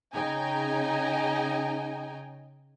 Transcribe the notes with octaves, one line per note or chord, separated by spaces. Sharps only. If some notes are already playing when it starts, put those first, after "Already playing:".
C#3 D#4 D#5 G5 G#5 A#5